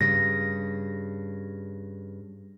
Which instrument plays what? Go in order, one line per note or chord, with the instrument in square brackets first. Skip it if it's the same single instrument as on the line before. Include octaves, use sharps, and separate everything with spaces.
[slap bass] G2 C#3 [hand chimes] A#6